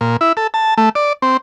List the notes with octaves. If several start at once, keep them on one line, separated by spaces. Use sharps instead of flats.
A#2
E4
A4
A5
A3
D5
C4